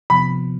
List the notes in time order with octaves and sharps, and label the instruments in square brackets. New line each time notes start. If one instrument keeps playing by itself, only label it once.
[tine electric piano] C3 F3 B3 [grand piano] B5